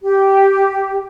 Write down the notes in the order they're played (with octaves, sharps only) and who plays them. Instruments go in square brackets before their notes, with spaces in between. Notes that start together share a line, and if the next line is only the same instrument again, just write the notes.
[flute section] G4